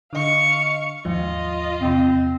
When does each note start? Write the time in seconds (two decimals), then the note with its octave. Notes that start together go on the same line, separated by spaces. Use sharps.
0.13 D3 D#5 F5 C#6
1.05 D#2 G#2 F3 F4 D#5
1.81 E2 C3 C4